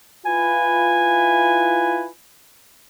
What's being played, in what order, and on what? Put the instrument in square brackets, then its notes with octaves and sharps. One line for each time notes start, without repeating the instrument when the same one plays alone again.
[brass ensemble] E4 F4 B4 [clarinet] G#5